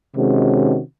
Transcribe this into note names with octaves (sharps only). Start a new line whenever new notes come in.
C3 D#3 G#3 C#4 F#4